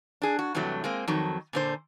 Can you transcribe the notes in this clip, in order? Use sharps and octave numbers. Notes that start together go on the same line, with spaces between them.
D4 G#4
F#4
G2 C3 E3 F#3 A3
G#3 A#3 C4
F2 D#3 F#3
A#2 D3 C5